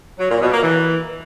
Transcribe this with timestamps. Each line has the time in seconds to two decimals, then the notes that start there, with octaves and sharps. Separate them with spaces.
0.19 F#3
0.30 A#2
0.41 B2
0.52 A#3
0.63 E3